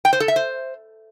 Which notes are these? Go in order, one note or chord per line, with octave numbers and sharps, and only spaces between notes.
G5
C5
A4
E5
C5